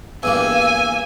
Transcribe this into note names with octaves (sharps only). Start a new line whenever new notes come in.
E2 G2 A#3 G#5 E6